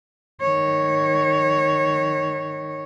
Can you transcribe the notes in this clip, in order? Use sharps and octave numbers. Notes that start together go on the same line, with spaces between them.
D#3 C#5